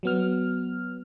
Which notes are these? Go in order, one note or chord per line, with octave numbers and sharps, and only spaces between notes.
F#3 B3 F6